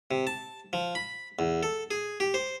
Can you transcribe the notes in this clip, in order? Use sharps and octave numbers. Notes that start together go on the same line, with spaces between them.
C3
A5
F3
B5
E2
A4
G#4
G4
C5